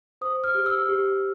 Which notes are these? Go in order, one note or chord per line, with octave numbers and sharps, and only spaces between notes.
C5 D#6
F6
G4
E6
G4